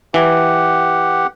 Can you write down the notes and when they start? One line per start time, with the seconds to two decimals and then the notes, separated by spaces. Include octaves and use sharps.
0.14 E3 G4 F#5